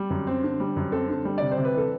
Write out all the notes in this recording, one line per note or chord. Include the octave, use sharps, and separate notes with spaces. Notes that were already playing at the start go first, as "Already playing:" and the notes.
Already playing: G3
F#2
C4
D3
G3
F#2
C4 A4
D3
G3
C3 D5
C5
C3
B4
E3 A4